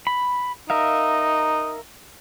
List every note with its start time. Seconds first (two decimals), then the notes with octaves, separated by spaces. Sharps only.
0.07 B5
0.70 D#4 A#4 E5 F5